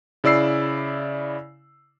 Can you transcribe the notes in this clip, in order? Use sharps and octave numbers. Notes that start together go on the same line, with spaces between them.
C#3 E4 D5 E6 C7